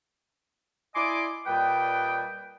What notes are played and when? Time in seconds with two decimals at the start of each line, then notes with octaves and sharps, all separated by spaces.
0.95 E4 D5 D#5 G#5 C6 D6
1.47 A#2 G3 B4 D#5 G5